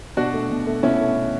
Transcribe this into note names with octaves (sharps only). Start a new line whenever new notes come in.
B2 D4 F#4
A3
B2
A3
B2 C#4 E4
A3
B2